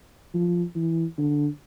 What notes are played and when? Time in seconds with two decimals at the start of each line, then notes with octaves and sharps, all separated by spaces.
0.34 F3
0.75 E3
1.18 D3